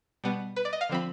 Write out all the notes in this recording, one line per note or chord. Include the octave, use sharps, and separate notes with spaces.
B2 G3 B3
B4
D5
D#5
F5
D3 F3 C4 B5